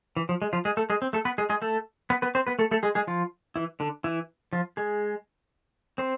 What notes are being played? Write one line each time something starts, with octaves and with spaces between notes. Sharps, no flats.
E3
F3
G#3
F3 F4
G#3 G#4
A3 A4
G#3 G#4
C4
A3 A4
B3 B4
G#3 G#4
G#3 G#4
A3 A4
B3 B4
B3 B4
C4 C5
B3 B4
A3 A4
A3 A4
G#3 G#4
G#3 G#4
F3 F4
E3 E4
D3 D4
E3 E4
F3 F4
G#3 G#4
C4 C5